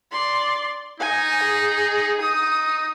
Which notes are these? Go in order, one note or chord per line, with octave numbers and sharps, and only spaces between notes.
D5 C6
D#4 G#5
G#4
D#4 D#6